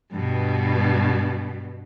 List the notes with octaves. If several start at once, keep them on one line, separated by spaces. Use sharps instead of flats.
G2 B2